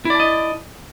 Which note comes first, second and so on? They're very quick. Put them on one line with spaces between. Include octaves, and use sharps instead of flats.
E4 D5 A5 D#5